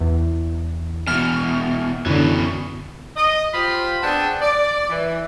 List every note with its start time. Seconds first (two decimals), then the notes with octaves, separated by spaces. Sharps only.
0.01 E2
1.07 E2 B2 F6
2.06 F#2 B2 D3 E3
3.17 D#5
3.54 F4 G4 C5 F5 B5
4.03 B3 C4 D4 G#4 G5 A5
4.42 D5
4.90 E3